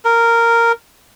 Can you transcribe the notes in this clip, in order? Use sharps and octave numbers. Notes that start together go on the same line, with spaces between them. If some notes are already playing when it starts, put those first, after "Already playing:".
A#4